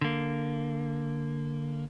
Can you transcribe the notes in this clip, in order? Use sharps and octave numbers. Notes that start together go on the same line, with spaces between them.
D3 A#3